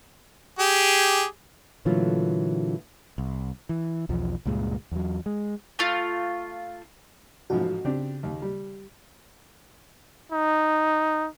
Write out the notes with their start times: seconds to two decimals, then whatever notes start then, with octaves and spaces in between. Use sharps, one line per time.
0.59 G4 G#4
1.85 A#2 D3 E3 F#3 A3 F4
3.18 C2
3.69 E3
4.09 B1 E2 F3
4.46 C#2 G2 A#2 G#3
4.92 E2 F#3
5.26 G#3
5.79 A3 F4
7.50 A1 G#2 F3 F#4
7.85 C#3 C4 D4 G4
8.23 D#2
8.42 G3
10.32 D#4